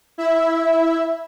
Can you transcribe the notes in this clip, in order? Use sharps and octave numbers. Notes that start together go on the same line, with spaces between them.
E4 E5